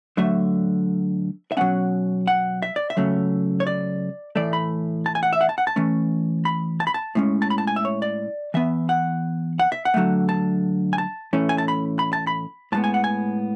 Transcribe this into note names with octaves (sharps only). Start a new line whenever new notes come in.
D3 F#3 A3 E5
E5
B2 F#3 A3 C#4 F#5
F#5
E5
D5
E5
C#3 F#3 A3 C#4
C#5
D5
A2 E3 A3 D5
B5
A5
G#5
F#5
E5
F#5
A5
F#5
A5
E3 A3 C#4
B5
A5
B5
A5
A2 G#3 C#4
A5
B5
A5
G#5
E5
C#5
D5
E3 B3 E5
F#5
F#5
E5
F#5
D3 F#3 A3
A5
G#5
A5
A2 E3 A3 C#4
G#5
A5
B5
B5
A5
B5
A2 G#3 B3 A5
G#5
F#5
G#5